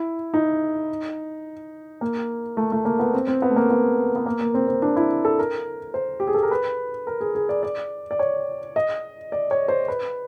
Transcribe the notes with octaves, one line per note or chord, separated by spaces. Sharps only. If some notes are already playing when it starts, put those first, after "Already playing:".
Already playing: E4
D#4
A#3
A3
A3
A#3
B3
C4
C4
B3
A3
A#3
B3
B3
A#3
A#3
C4
C4
D4
E4
A4
A#4
C5
G4
G#4
A4
A#4
B4
A#4
G#4
G#4
D5
D5
D5
C#5
D#5
D5
C#5
C5
B4